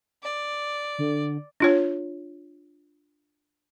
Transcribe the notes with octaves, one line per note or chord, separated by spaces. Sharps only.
D5
D3
D4 F4 C#5